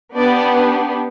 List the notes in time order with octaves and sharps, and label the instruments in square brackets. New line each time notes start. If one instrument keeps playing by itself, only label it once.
[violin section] B3 D4 G4 D5